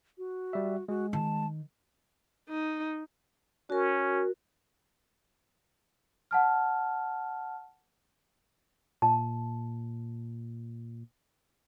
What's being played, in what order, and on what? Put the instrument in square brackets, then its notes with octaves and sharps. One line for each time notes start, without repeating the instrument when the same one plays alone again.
[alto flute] F#4
[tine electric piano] G3 E5
[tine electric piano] G#3 [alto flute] F#4
[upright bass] D#3 [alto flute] A5
[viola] D#4
[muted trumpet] C#4 [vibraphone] F#4 A#4
[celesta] F#5 A5 F6
[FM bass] A#2 [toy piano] A5